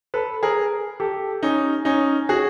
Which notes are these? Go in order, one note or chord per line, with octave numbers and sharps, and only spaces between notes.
A4 B4
G#4 A#4
G4 A4
C#4 D#4
C#4 D#4
F#4 G#4